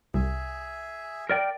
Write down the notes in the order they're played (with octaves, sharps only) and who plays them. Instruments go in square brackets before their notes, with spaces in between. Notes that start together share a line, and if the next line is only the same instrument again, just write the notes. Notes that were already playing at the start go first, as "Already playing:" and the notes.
[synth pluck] C2 [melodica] G#4 E5
[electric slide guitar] A#4 D5 G5